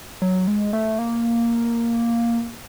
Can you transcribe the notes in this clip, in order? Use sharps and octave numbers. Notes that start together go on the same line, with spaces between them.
F#3
G#3
A3
A#3